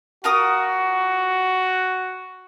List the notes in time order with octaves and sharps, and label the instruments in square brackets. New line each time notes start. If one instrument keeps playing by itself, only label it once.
[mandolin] F4 A#4 D#6 [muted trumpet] F#4